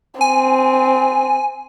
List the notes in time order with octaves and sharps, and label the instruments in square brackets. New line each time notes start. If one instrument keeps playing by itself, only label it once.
[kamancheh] C4 [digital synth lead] G#5